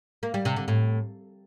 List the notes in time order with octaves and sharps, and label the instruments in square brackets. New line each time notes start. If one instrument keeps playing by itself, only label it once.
[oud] A#3
G3
C3
D3
A2